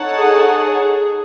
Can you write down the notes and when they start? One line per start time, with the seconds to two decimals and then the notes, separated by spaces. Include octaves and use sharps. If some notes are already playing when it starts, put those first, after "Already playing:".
Already playing: D#4 A4 C#5 F#5 A5
0.15 G#4
0.48 G#4